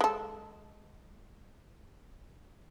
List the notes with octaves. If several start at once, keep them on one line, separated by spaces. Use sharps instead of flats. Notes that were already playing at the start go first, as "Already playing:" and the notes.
G#3 A4